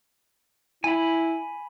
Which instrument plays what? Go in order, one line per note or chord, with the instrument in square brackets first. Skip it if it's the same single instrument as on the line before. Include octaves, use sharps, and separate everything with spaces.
[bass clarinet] E4 [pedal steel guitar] G#5 B5